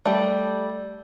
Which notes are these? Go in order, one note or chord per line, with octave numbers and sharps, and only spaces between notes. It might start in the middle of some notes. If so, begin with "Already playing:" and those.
G3 A3 D5